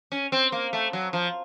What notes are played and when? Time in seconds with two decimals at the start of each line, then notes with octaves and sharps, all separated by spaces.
0.12 C#4
0.32 C4
0.52 A#3
0.73 A3
0.93 F#3
1.13 F3